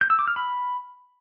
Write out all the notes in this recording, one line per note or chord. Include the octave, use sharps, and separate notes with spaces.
G6
E6
D6
F6
B5